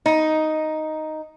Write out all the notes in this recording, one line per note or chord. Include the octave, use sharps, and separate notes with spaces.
D#4